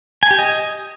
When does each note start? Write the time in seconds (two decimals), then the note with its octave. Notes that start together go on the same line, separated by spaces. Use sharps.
0.23 G#5
0.31 G4
0.39 D#5